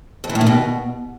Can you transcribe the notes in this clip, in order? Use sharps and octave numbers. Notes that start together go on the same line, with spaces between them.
F2
E3
A2
D#3
B2